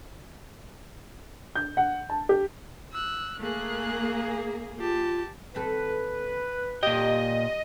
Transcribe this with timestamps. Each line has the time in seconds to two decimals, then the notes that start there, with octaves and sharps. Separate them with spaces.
1.55 G6
1.77 F#5
2.10 A5
2.29 G4
2.92 E6 F#6
3.40 A3 A#3 G#4 F#6
4.79 F4 G4 A5
5.55 D#2 C4 A4 B4
6.83 A#2 G4 D#5 G5